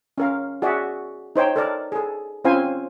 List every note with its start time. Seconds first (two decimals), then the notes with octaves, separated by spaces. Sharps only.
0.18 C#4 A#4 F5
0.62 F#4 G#4 D5 E5
1.36 D#4 C5 C#5 G5
1.56 A4 A#4 D5
1.92 G#4 A4
2.45 C4 C#4 F4 C5 F5 G#5